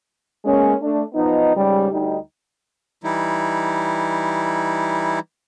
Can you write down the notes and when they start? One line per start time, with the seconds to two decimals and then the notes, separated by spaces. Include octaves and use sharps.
0.45 G#3 A#3 B3 C#4
0.81 A3 D4
1.14 F3 B3 D#4
1.55 G#2 C#3 G3
1.91 D2 G3 D#4
3.04 E3 G3 D#4 E4